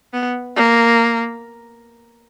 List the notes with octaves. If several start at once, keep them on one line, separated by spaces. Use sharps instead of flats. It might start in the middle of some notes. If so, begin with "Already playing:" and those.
B3
A#3